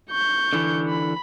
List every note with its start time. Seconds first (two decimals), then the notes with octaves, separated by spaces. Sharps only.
0.11 C#6 G6
0.53 D3 E3
0.89 B5